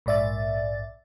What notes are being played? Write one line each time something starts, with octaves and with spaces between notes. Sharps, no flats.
A#1 G#2 D5 E5 A6